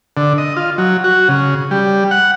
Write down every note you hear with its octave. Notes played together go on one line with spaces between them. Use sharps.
D3
D#5
F4
F#3
F#4
C#3
G3
F#5